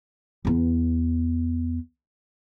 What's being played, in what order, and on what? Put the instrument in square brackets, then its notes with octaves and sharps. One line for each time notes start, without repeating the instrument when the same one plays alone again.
[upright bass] E2 B3